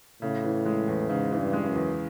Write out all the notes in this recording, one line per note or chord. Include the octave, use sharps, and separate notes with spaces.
A2 C#3
E3
G#3
E2
G#2 C#3
E3
G2
G#3
F#2
E2